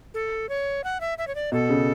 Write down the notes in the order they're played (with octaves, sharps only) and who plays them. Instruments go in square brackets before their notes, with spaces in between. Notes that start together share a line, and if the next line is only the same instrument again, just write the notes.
[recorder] A4
C#5
F#5
E5
E5
C#5
D5
[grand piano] B2 [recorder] A4
[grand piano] C#3